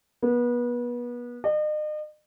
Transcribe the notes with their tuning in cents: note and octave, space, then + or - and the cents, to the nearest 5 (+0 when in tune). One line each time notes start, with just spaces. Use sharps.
B3 -30
D#5 -40